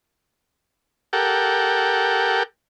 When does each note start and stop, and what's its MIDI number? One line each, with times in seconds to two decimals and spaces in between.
1.13 2.43 67
1.13 2.43 69
1.13 2.43 70
1.13 2.43 78
1.13 2.43 79